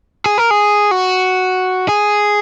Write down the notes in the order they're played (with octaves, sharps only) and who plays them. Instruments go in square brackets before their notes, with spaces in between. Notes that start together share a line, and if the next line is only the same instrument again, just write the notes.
[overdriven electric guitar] G#4
A#4
G#4
F#4
G#4